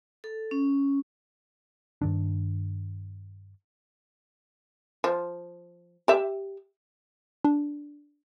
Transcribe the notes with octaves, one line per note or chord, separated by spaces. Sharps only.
A4
C#4
G2 D#3 D4
F3
G4 E5
D4